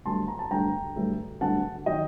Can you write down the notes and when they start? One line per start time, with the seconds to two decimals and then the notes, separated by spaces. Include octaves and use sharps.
0.05 G2 D3 F#3 A3 A5 C6
0.28 A#5
0.39 A5
0.51 G2 D3 F#3 A3 G5 A#5
0.96 G2 D3 F#3 A3
1.41 G2 D3 F#3 A3 F#5 A5
1.86 D#3 F#3 D#5 G5